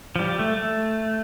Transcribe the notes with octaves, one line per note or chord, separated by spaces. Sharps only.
F3
G3
A3
A3